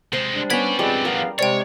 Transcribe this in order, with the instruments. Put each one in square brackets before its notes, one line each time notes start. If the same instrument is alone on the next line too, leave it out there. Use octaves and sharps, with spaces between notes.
[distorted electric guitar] C3 G#3 [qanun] C5 C6
[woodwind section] G3 D4
[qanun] B3 C#4 [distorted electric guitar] G4 D5 [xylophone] G#6 B6
[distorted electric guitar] F3 D4 [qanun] G3 [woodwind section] G#3 C4 F4
[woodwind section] E2 B3 F5 [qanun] A#4
[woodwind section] C3 G#3 [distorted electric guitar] C#5 [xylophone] D5 G5